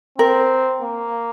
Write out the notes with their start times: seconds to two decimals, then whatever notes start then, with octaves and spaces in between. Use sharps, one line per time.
0.18 C4 A#4
0.83 A#3